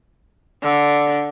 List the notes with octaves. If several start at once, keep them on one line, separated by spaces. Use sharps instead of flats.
D3